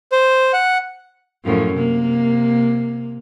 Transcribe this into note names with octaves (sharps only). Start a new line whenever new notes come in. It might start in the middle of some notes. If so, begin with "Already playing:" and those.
C5
F#5
F#2 A2 F3
C3 A#3